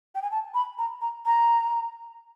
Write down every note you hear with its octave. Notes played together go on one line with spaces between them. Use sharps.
G5
G#5
A5
B5
A#5
A#5
A#5